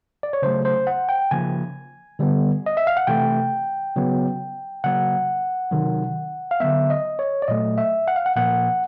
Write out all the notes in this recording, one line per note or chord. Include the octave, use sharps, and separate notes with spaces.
D5
C#5
C#3 F#3 A3 C5
C5
F#5
G5
C#3 F3 A#3 G#5
D3 G3 B3
D#5
E5
F5
F#5
C3 E3 A3 G5
C#3 F#3 B3
C#3 F#3 A#3 F#5
C3 D#3 F#3
F5
D3 F#3 B3 E5
D#5
C#5
D5
A#2 F#3 A3 D#5
E5
F#5
F5
F#5
A#2 F3 A#3 F#5